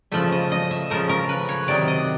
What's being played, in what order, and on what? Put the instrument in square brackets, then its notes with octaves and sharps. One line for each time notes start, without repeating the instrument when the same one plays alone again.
[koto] C#3 F3 A3 E5
D#5
D#5
E5
C#3 F3 A3 A#4
A#4
B4
C#5
C3 D#3 F#3 D5
D#5